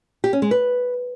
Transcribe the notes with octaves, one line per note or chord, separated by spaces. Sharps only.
G4
C#4
G#3
B4